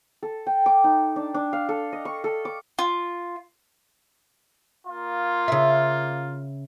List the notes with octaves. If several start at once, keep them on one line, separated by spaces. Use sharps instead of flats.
A4
G5
D6
D#4
D4
D4
F5
A4
D#5
C#6
A4
D6
F4
A#3 F4
C#3 E5